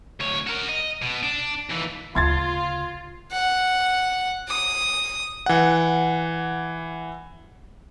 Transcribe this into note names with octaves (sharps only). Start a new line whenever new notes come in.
D2 C#5
F#4 A#4
D#5
B2
D4
D#2 E3
D2 C#3 F4 C6 G#6 A6
F#5
D#6
E3 F#5